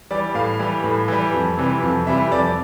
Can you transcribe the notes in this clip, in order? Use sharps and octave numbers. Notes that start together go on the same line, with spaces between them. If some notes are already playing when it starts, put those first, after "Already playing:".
E3 G3 D5
A2 F5
E3 G3
A2
E3 G3
F2
C3 E3 G3
F2
C3 E3 G3 E5
F2 D5